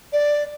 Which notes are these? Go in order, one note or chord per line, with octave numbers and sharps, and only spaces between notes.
D5